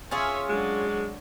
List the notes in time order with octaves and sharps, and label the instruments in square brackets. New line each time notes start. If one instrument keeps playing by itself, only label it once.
[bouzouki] C#4 F4 G#4 [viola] C#5 E5
[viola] F#3 D4 [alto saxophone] G#3